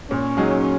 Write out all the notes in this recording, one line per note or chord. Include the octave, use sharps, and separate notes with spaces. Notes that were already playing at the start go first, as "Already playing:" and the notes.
A#2 C#4
F#3 D#4 G#4